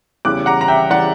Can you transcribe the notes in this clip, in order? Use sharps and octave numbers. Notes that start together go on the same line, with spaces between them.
E2 C#3 E3 G3 D6 F#6
F#5 A#5
A#5
E5 G5
C#3 E3 G3 D5 F#5